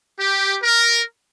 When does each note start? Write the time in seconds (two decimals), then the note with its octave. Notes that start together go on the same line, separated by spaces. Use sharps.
0.20 G4
0.63 A#4